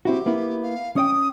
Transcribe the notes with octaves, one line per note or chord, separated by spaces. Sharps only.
C4 E4 F#4 G4
A#3 B3 E4
F5
C#4 D5 G5 D#6